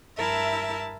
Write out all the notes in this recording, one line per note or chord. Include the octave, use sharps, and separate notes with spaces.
G2 E4 A#4 E5 A5